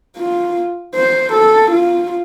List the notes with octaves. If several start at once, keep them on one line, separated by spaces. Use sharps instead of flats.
F4
C5
A4
F4